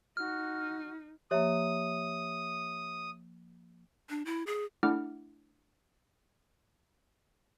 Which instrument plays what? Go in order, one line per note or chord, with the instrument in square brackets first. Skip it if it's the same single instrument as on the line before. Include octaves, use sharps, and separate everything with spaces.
[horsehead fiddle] D#4 [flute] F#4 [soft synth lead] F6
[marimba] F3 A#3 [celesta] G4 C#5 E5 [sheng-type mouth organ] D#6
[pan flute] D4
E4
G#4
[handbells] A3 D4 E4 F#5 D6 F6